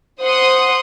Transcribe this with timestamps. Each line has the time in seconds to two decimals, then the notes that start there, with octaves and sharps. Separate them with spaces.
0.22 C5 F#5 C6 D#6